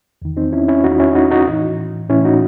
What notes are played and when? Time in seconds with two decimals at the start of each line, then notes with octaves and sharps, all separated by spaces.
0.22 E2 D#3
0.37 C4 D#4
0.52 C#4 E4
0.68 C#4 E4
0.84 E2 D#3 D#4 F#4
1.00 C#4 E4
1.15 D#4 F#4
1.31 D#4 F#4
1.47 A2 E3
2.10 A2 E3 C#4 E4
2.25 D#4 F#4